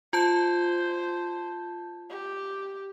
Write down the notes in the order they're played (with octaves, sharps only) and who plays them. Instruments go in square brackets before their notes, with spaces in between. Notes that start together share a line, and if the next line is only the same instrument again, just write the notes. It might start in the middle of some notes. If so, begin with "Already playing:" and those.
[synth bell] F4 A5 G6 [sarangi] C5
[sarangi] G4